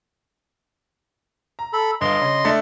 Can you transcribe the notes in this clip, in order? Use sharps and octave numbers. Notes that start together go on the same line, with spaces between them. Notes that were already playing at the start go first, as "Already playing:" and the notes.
A#5
A4 B5
G1 D#5 F5 C6 G7
C#3
A3 D4 A6